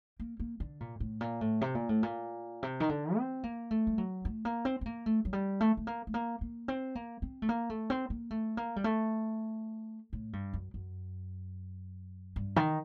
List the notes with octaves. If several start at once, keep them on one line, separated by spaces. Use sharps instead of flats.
A#3
A#3
D3
A#2
A2
A#2
A2
C3
A#2
A2
A#2
C3
D#3
D3
C4
A#3
A3
G3
F#3
A3
A#3
C4
C4
A#3
A3
F#3
G3
A3
A3
A#3
A3
A#3
A#3
C4
A#3
C4
A3
A#3
A3
C4
A#3
A3
A#3
G3
A3
A2
G2
F#2
F#2
G2
D#3